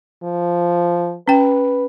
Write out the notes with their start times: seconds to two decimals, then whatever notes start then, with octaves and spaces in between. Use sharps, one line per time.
0.23 F3
1.28 C#4 B4 G5